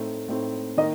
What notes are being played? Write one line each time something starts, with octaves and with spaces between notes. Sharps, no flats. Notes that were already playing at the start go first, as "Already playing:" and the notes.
Already playing: A2 A3 C4 D#4
A2 A3 C4 D#4
D#3 A#3 D#4 D#5